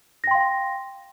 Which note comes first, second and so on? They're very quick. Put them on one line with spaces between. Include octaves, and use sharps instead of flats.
A#6 G5 C6 F5